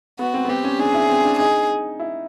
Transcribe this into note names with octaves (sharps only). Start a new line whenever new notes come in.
B3 F#4
C4
B3
C4 G4
C#4
D4 G#4
E4
C4
D4
D#4 G#4
E4